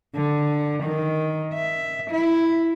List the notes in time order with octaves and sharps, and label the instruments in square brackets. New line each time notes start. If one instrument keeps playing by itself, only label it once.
[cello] D3
D#3
E5
E4